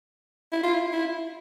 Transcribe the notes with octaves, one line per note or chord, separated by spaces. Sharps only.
E4
F4
E4
E4